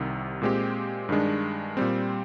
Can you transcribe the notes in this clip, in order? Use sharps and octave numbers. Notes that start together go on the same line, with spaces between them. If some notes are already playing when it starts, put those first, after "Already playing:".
Already playing: C2 C3 D#3
A#2 G#3 C4 G4
G2 D#3 G#3 D4
A#2 G3 C4